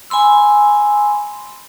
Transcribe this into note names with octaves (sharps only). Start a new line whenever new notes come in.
G#5 B5 C6 E6